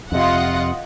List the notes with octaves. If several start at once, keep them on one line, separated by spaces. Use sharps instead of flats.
F2 C3 F4 D#5 F#5